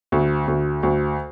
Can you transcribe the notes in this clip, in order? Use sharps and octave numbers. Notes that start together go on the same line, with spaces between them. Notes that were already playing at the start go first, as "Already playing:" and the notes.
D2
D2
D2